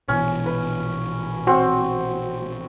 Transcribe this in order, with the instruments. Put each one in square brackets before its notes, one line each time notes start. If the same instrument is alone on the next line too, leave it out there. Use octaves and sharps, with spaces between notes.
[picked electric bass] A#1 B2 E3 [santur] C#4
[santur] B4
[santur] C4 C#5 [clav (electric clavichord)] F#4